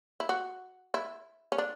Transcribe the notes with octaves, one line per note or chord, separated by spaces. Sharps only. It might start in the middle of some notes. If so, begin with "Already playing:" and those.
E4
F#4
E4
C#4
D4